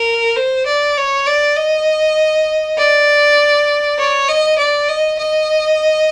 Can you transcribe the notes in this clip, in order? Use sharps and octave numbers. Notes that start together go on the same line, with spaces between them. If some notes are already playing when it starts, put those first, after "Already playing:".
Already playing: A#4
C5
D5
C#5
D5
D#5
D5
C#5
D#5
D5
D#5
D#5